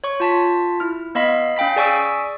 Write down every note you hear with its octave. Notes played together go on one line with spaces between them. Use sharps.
C#5 C#6
F4 A5 B6
E4 F6
B3 D#5 F5 B5 B6
C#4 F5 G5 B5 B6
G#4 D5 G#5 C#6 E6 B6